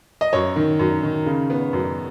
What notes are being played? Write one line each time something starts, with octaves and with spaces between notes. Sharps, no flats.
D#5
F#2 C#5
D#3
F#2
D#3
C#3
B3
F#2